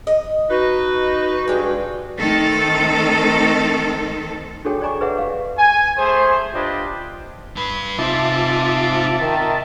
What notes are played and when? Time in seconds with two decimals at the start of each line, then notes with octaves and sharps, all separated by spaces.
0.07 D#5
0.50 D#4 F#4 B4
1.48 G2 G#3 D5 G5
2.18 D#3 A3 C4 A4
4.65 D4 F#4 G#4 A4 C#5 G5
4.81 C#5 D5 G#5 A#5 C#6 D6
5.01 G#4 B4 C#5 E5 F#5
5.18 G4 F5
5.57 G#5
5.98 A3 G#4 C5
6.53 D4 F4 G4 B4 D#5
7.56 G2 B4
7.99 C3 D#4 F4 C5 E5 A5 D6
9.19 D#3